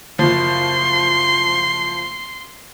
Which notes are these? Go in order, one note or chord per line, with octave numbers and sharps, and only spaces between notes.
F#1 F3 C6